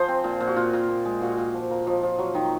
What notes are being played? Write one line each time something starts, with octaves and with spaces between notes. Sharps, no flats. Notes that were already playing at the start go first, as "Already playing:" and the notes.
Already playing: F3 G#4 C5
C4
A#2
A#2
F#4
A#2 F4
A#2
A#2
G#3
A#2 F#4
A#2
F3
A#3
F3 D#5
F3
F#3
D#3